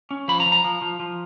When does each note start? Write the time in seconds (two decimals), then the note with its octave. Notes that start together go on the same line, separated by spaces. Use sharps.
0.11 C#4
0.28 F3 B5
0.40 A#5
0.46 F3
0.52 A#5
0.64 F3
0.82 F3
1.00 F3